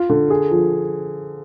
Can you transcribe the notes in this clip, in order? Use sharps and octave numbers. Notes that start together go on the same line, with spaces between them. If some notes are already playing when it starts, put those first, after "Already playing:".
Already playing: F4
D3
G#4
F3